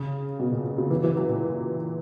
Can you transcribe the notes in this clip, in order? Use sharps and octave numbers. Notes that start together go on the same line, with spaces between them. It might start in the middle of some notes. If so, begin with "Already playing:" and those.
Already playing: C#3
B2
A#2
C#3
E3
E3
F#3
A#2